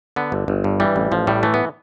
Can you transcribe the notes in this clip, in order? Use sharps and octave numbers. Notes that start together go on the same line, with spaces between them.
D3 B3
G1
G1
G2
E3 G3
A1
A1 F3
A2 G3
E3 A3
B3